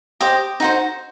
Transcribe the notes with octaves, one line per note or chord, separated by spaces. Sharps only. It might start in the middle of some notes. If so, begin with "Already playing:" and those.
G4 C5 D#5
D#4 F#4 C5